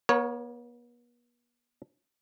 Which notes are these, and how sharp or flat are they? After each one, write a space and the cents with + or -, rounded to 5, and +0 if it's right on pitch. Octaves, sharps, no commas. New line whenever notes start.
B3 -40 A#4 +15 C#5 +0